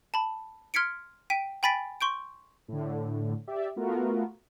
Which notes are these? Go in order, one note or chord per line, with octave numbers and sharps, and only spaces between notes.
A5 B5
C6 F6 G#6 B6 C#7 D7
G5 B6 D7 D#7
G5 G#5 B5 A6 B6 D7
C6 C#6 G6 D7
A2 D3
G4 D5 E5
A3 B3 F4 F#4 A#4